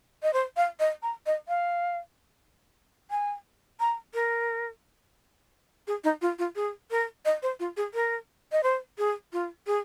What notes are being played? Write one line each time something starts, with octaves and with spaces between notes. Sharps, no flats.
D#5
C5
F5
D#5
A#5
D#5
F5
G#5
A#5
A#4
G#4
D#4
F4
F4
G#4
A#4
D#5
C5
F4
G#4
A#4
D#5
C5
G#4
F4
G#4